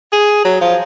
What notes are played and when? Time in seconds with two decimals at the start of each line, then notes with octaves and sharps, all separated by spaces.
0.13 G#4
0.45 F#3
0.61 F3